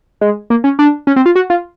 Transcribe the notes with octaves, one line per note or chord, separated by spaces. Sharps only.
G#3
A#3
C#4
D4
C#4
C4
F4
F#4
F4